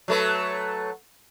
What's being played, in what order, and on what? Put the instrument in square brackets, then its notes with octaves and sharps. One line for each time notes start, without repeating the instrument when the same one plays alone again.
[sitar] F#3 A3 B4